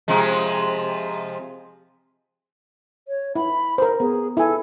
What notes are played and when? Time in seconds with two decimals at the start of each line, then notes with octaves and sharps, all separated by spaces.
0.08 C3 F3 G#3
3.08 C#5
3.35 E4 B5
3.78 A#4 C5
4.00 B3 G#4
4.37 E4 A4 G#5